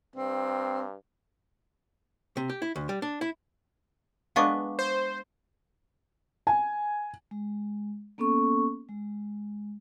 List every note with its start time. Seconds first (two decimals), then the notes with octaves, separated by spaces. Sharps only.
0.16 G2 C4
2.37 C3
2.50 G4
2.62 E4
2.76 D2
2.89 G3
3.02 D4
3.21 E4
4.36 G#3 B3 D4 F5 C#6 D6
4.79 C5
6.47 G#5
7.31 G#3
8.18 A#3 B3 C#4 A4 C#6
8.89 G#3